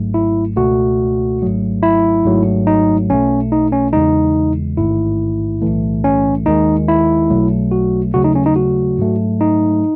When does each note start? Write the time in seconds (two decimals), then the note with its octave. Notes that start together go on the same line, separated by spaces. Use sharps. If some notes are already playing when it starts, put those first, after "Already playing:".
Already playing: G#1 G#2 F#3 A3
0.14 E4
0.56 C#2 B2 A3 F#4
1.42 G#1 G#2 F#3 A3
1.83 E4
2.25 G#1 G#2 F#3 A3
2.67 D#4
3.10 B1 B2 A3 C#4
3.52 D#4
3.72 C#4
3.93 E2 C#3 E3 G#3 D#4
4.77 A1 G#2 D#3 A3 E4
5.62 B1 A2 E3 A3
6.04 C#4
6.46 D#2 D#3 G#3 D#4
6.88 E4
7.30 B1 B2 F#3 A3
7.71 F#4
8.14 D#2 C#3 F#3 A3 F#4
8.24 D#4
8.35 C#4
8.46 D#4
8.56 F#4
8.98 G#2 F#3 A3
9.41 D#4